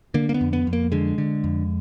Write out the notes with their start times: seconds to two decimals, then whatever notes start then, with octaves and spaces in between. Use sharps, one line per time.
0.14 D3 A#3
0.29 A#3
0.34 B3
0.41 F2
0.53 B3
0.67 F2
0.73 A#3
0.92 D3 G#3
1.18 D3
1.44 F2